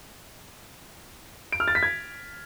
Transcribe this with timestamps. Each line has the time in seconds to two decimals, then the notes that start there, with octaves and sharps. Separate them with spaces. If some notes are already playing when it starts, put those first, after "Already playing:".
1.52 D7
1.60 F6
1.68 A6
1.75 B6
1.83 G#6